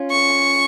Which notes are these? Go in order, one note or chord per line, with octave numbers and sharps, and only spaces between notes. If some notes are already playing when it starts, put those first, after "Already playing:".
Already playing: C#4 F4
C#6